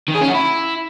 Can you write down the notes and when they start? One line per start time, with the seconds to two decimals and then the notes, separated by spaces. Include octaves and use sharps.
0.08 D#3
0.15 G#4
0.21 C#4
0.28 F#4
0.34 E4